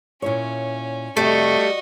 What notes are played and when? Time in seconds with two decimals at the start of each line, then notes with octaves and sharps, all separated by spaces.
0.22 A#2 C#4 E4 C#5
1.17 F2 C3 G3 A3 F#4 D#5